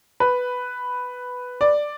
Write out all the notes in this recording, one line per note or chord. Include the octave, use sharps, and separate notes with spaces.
B4
D5